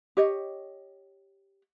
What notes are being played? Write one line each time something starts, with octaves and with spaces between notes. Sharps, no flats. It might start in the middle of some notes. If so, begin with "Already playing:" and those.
G4 C#5 D#5